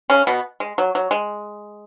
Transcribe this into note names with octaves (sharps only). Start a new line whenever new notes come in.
C#3 C#4
B2 B3
G#3
F#3
F#3
G#3